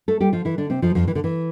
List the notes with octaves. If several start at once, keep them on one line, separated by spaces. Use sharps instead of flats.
A3 A4
G3 G4
F3 F4
E3 E4
D3 D4
C3 C4
F2 F3
F2 F3
E3
D3
E3